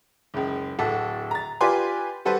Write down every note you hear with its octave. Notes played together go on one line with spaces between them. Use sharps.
F#1 C#2
D1 F#4 A4
A#5 A6
F4 G4 B4 D5 G#5 C6
G3 F#4 A4 B4 C5